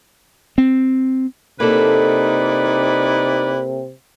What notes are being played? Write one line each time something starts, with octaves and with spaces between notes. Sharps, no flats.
C4
C3 A#3 D#4 E4 A4 B4 D5